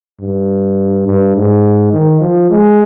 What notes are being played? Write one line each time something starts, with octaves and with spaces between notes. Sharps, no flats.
G2
G2
G#2
D#3
F3
G#3